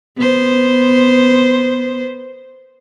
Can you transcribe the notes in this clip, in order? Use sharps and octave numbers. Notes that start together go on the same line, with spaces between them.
B3 C5